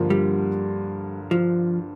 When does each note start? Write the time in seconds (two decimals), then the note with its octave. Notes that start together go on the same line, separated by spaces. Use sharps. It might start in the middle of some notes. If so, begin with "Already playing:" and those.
Already playing: G2 D3 F3 A#3 F4
0.10 G3
1.31 F3